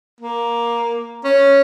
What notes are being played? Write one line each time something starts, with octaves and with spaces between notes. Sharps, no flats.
A#3
C#4